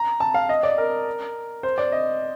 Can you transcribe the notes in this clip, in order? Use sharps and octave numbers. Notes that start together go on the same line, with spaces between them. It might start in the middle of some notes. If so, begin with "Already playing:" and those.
Already playing: A#5
A5
F5
D#5
D5
A#4
C5
D5
D#5